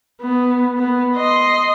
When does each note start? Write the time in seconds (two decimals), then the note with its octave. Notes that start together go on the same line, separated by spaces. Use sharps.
0.22 B3
0.78 B3
1.16 D#5 C6